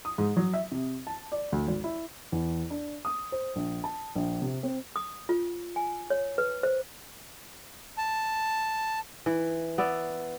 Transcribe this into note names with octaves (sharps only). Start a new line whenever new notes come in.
D#6
G#2
F#3
E5
C3
A5
D5
D2
G#1
E4
E2
D4
D#6
C5
A#1
A5
A#1
C3
C4
D#6
F4
G#5
C#5
B4
C5
A5
E3
B3 D5 E5